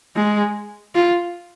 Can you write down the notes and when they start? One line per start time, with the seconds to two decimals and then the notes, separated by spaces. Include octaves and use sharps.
0.16 G#3
0.95 F4